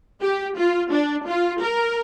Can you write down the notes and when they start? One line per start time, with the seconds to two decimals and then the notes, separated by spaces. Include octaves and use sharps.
0.22 G4
0.57 F4
0.91 D4
1.27 F4
1.61 A#4